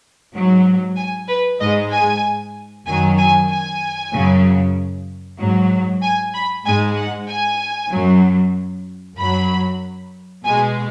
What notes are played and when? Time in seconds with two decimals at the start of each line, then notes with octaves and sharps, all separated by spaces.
0.33 G#2 F#3
0.96 G#5
1.28 B4
1.60 G#2 G#3 D#5
1.91 G#5
2.86 F#2 D#3 F#3 G#5
3.18 G#5
3.49 G#5
4.12 F#2 C#3 F#3
5.39 G#2 F#3
6.02 G#5
6.34 B5
6.65 G#2 G#3 G#5
6.97 F#5
7.28 G#5
7.91 F#2 F#3
9.18 F#2 F#3 B5
10.45 B2 G#3 G#5